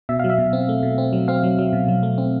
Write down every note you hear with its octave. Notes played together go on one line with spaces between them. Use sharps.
B2 E5
F#3 F5
E5
B2
C4
A3
B2
C4
F#3
C4 F5
F#3
F#3
B2
F#3
A3
C4